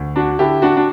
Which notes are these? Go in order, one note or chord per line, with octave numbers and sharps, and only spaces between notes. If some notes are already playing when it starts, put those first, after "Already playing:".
Already playing: D2
D4 F#4
D3 E4 G4
D4 F#4
D4